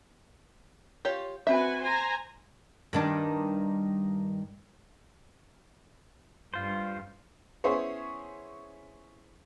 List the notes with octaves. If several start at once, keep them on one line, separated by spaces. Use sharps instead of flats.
F4 G4 C#5
C4 F#4 B4 E5 G#5
C5 G#5 A#5
G2 D#3 D4
G2 F4 C5
B3 C#4 E4 G#4 C5 C#5